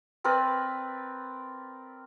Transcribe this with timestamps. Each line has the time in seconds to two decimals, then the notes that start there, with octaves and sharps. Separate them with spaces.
0.24 C4 A#4 B4 D5